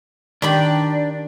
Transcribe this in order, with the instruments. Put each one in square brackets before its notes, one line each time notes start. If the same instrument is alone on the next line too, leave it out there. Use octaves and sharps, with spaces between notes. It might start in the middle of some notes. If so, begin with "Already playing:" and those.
[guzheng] D#3 G4 B5 [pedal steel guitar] D4